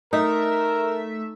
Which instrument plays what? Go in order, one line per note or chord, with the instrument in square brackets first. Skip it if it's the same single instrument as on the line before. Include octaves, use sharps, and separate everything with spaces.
[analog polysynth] A3 E5 [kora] D#4 [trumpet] A#4